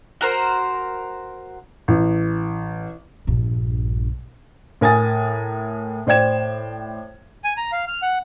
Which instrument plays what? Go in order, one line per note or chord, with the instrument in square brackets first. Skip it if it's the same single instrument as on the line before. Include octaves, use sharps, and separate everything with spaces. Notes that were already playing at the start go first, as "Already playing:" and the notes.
[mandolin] F#4 A#4 C5
[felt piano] A1
[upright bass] A#1 G2
[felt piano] A2 A#4 G#5 D#6 A6
A2 C5 D5 G5 G#6 E7
[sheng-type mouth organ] G#5
A#5
F5
F6
F#5